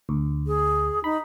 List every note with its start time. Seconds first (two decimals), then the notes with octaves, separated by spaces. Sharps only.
0.09 D2
0.47 G#4
1.04 D#4 B5